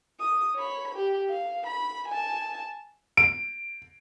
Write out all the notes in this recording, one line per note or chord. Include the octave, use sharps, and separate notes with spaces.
D#6
C#5 B5
G4
F5
B5
G#5 A5
D7